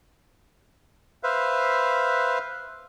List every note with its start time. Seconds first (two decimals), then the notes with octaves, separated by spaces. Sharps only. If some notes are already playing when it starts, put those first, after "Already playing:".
1.23 B4 C5 E5 F5